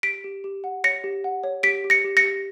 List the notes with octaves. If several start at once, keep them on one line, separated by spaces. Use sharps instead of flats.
G4 B6 D7
G4
G4
F#5
C#5 A#6 C#7
G4
F#5
C#5
G4 B6 D7
G4
A#6 C#7
G4
A#6 C#7
G4